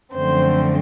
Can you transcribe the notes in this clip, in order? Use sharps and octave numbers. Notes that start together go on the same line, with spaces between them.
F#2 D3 F3 A3 C4 C5